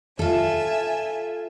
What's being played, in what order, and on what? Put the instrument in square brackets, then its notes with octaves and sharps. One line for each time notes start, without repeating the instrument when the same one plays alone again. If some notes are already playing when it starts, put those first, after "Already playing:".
[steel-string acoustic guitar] F4 A4 [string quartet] E5 G#5